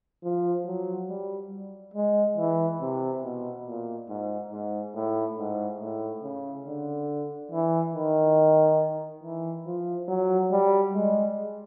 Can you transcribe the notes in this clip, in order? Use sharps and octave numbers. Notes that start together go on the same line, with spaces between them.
F3
F#3
G3
G#3
E3
C3
B2
A#2
G#2
G#2
A2
G#2
A2
C#3
D3
E3
D#3
E3
F3
F#3
G3
G#3